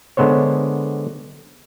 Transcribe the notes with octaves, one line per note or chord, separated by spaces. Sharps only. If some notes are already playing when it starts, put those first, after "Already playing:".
D3 G#3 B3 C5 C#5